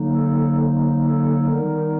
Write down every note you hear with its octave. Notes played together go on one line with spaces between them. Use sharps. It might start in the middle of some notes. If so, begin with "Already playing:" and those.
Already playing: D3 F#3 A#3 D#4
A4
A4
D#3 G3 B3 D#4 A#4